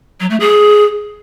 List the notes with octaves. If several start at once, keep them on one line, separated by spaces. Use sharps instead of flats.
F#3
A3
G#4